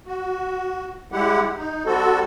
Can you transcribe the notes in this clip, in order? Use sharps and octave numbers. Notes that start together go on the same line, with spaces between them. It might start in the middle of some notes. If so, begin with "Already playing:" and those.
F#4
G3 G#3 E4 G4 F#5
D#4
G3 C4 F#4 A4